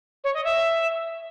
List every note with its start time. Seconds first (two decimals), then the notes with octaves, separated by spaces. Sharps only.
0.24 C#5
0.34 D#5
0.44 E5